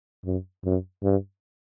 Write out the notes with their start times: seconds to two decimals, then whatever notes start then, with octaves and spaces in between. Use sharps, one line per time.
0.25 F#2
0.64 F#2
1.03 G2